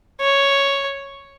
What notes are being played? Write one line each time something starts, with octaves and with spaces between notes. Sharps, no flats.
C#5